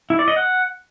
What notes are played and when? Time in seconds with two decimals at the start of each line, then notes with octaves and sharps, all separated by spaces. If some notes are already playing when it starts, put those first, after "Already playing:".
0.10 E4
0.19 D5
0.28 D#5
0.36 F#5